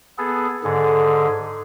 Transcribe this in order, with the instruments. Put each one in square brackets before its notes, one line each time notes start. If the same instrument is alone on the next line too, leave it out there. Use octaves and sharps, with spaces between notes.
[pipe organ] B3 G#4 A4
[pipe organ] G#2 D3 G#4 [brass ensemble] A4